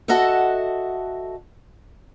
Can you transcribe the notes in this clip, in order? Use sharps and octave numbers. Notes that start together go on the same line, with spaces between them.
F#4 A4 D#5 E5 F#5